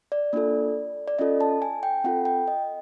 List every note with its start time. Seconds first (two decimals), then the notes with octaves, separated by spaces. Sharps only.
0.12 D5
0.33 A#3 D4 F4 A4
1.08 D5
1.19 C#4 F4 A4 D#5
1.41 A5
1.62 G#5
1.83 G5
2.04 C4 F4 A4 F#5
2.25 G5
2.48 D#5